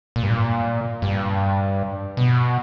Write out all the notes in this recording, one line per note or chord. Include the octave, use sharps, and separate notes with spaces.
A#2
G2
A#2
G2
B2